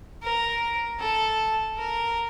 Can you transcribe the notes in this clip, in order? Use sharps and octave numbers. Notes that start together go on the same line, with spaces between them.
A#4
A4
A#4